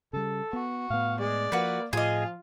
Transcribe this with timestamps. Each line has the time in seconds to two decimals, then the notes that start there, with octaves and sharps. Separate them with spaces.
0.13 C#3 G3 A4
0.53 B3 F#4
0.90 A2 B3 F5
1.19 G#3 D5
1.52 F3 A#3 F#4 B4
1.93 A2 F3 F4 G#4 D#5